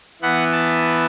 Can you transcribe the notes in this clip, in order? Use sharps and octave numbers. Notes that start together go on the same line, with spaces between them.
E3 B3 F#5
A5